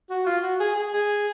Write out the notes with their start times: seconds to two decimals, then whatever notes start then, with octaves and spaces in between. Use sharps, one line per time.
0.10 F#4
0.26 F4
0.43 F#4
0.60 G#4
0.76 G#4
0.93 G#4